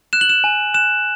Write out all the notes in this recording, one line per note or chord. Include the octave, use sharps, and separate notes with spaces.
F#6 E7
F#7
E7
G#5
F#6 E7